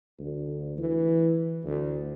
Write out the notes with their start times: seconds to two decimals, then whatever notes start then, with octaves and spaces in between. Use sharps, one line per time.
0.20 D2
0.78 E3
1.65 D2